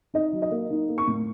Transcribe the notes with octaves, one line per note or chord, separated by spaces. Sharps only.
D#4 D#5
F#3
D#5
A#3
D#4
A#3
C#6
A2